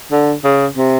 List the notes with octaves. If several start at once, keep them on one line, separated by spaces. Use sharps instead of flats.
D3
C#3
C3